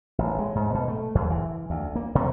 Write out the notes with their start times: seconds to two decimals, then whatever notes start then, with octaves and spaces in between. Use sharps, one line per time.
0.18 A1
0.39 G#3
0.55 G#2
0.74 B2
0.88 A3
1.15 E2
1.30 E3
1.70 D2
1.95 A#3
2.15 C3